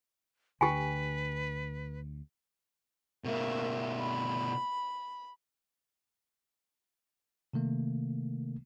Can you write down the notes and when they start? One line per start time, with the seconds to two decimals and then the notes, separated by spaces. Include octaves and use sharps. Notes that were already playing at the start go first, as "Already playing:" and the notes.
0.61 D2 D3 G4 B4 G5 G#5
3.25 B2 A3 A#3 E5
3.99 B5
7.53 C3 D#3 A3 A#3